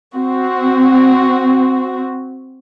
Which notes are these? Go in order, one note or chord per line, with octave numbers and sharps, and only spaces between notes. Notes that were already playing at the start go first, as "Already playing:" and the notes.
C4 F#4